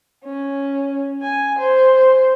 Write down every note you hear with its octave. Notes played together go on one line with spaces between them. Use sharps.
C#4
G#5
C5